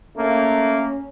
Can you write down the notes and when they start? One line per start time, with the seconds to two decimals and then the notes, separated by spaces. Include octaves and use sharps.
0.17 A3 A#3 C#4